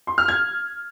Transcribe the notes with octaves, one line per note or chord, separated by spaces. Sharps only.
C6
F6
G#6